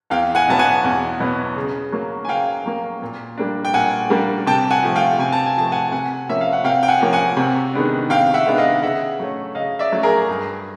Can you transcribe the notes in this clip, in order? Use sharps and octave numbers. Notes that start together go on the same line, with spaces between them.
E2 F5 G5
F#5 G#5
B2 F#3 B3 A5
F#5 G#5
E2
B2 F#3 B3
C#3
F#3 A#3
G#5
C#3 F5 G5
F#3 A#3
A#2
G3 A#3 D4
G5
A#2 F#5 G#5
G3 A#3 D4
C3 G5 A5
F#5 G#5
F3 A3
F5 G5
C3 G#5
A5
G#5
F3 A3 A5
F#5 G#5
C3 F#5 G#5
F3 A#3 C#4 E5
F5
F#5
C3 F5 G5
G5
F#5 G#5
F3 A#3 C#4
F#5 G#5
C3
D#3 G#3 B3 D4
C3 F5 G5
E5 F#5
D#3 G#3 B3 D4
D#5 F5
C#3 E5 F#5
F#3 A3 C#4
C#3 D#5 F5
D5 E5
F#3 A3 C#4
G#4 A#4
G2